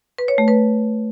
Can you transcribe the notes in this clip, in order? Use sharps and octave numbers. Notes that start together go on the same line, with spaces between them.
B4
C#5
A3
B4